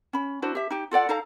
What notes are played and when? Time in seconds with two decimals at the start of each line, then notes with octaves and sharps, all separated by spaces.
0.13 C#4 B5
0.42 D4 E4 F#4 C5
0.55 G4 E5
0.70 D#4 G4
0.91 F4 A4 D5 F#5
1.09 D#4 A4 F5 A#5